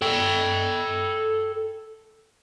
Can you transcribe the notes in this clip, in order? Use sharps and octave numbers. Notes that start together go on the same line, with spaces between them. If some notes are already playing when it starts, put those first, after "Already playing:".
A4 G5